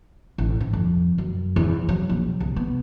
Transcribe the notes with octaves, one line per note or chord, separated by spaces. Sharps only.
A1
G#2
F2
F#2
E2
F#3
A#1
C2
B3